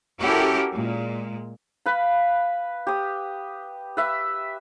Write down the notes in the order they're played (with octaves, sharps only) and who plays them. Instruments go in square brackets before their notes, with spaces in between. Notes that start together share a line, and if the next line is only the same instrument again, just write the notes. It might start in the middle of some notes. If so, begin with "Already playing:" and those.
[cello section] C#4 E4 F#4 G4 A4 A#4
A#2 G#3
[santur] B4 F5 B5
G4 D#6
B4 E5